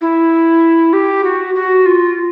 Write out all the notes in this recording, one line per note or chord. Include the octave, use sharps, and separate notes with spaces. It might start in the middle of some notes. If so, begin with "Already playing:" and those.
E4
G4
F#4
F#4
F4